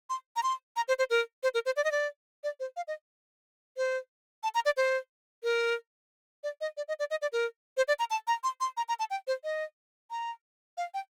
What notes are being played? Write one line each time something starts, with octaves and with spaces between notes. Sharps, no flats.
C6
A#5
C6
A#5
C5
C5
A#4
C5
A#4
C5
D5
D#5
D5
D5
C5
F5
D#5
C5
A5
A#5
D5
C5
A#4
D5
D#5
D5
D#5
D5
D#5
D5
A#4
C5
D5
A#5
A5
A#5
C6
C6
A#5
A#5
A5
G5
C5
D#5
A#5
F5
G5